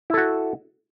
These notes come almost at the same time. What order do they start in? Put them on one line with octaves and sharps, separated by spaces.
E4 A4 F#4